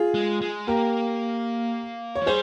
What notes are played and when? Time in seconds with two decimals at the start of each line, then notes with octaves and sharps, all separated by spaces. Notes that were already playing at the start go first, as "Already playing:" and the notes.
Already playing: F4 G#4
0.14 G#3
0.41 G#3
0.67 A#3 G4 A#4
2.15 C#5
2.21 F3
2.26 G3 G#4 C5